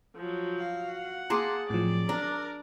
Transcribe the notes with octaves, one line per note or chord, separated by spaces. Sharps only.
F3 F#3
F#4 F5
F#5
A#3 G#4 A5 A#5 C6 D6
A2 F3 F#3 C4 D5
D4 A#4 A#5